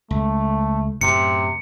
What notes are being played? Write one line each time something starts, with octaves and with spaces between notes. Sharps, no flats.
C#2 A3
F#2 A2 C3 C#7